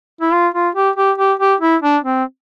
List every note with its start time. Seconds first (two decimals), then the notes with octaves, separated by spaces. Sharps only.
0.21 E4
0.33 F4
0.54 F4
0.75 G4
0.96 G4
1.18 G4
1.39 G4
1.61 E4
1.82 D4
2.04 C4